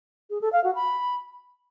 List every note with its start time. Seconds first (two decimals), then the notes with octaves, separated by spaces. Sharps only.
0.30 G#4
0.41 A4
0.53 F5
0.64 F#4
0.75 B5